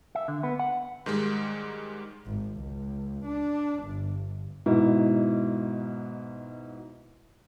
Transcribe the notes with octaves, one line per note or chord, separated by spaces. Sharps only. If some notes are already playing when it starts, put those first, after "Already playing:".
E5
D3
B3
F#5
G#2 D#3 G3 G#3
G#1
C#2
D4
G1
G#2 B2 D#4 E4